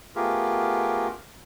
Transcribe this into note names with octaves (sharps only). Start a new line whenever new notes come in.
A3 B3 F4 G4 G#4 A#4